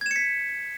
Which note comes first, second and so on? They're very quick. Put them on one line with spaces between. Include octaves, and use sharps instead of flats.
G#6 E7 C#7 B6